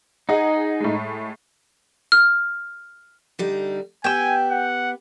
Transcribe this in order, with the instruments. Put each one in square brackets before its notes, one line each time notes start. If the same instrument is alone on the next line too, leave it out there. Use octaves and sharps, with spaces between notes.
[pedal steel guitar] D#4 [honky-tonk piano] G#4 D#5 F#5
[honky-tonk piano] A2 G#3
[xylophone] F6
[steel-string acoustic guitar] D3 G3 D#4
[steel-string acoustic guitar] B3 G4 [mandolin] G5 E6 [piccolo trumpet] G#5
[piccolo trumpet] F#5